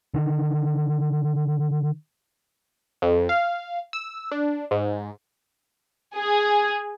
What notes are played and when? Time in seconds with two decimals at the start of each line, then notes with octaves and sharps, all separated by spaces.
0.14 D3 D#3
3.02 F2
3.29 F5
3.93 E6
4.32 D4
4.71 G#2
6.16 G#4